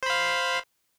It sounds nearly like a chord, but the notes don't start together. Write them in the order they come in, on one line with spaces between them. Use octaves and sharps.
C5 B5 F5